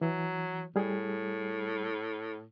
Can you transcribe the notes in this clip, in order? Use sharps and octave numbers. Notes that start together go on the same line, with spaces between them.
E3 F#3
A2 G3 G#4